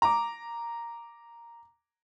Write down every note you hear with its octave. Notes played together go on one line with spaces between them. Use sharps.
A#5 D6